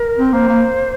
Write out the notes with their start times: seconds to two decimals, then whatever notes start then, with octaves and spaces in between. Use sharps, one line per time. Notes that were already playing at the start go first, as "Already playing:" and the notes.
Already playing: A#4
0.19 C4
0.33 A#3 C5
0.48 A#3